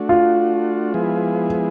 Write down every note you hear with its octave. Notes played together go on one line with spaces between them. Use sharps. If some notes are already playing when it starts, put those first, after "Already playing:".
Already playing: A3 D4 F#4
F4
F3 G#3 B3 E4 G#4